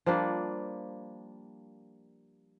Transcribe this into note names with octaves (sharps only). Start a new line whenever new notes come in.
F3 G3 A#3 D4